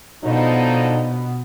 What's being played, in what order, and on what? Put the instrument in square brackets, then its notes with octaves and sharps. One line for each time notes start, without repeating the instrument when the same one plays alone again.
[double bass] B2 B3 [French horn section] D3 F3 D#4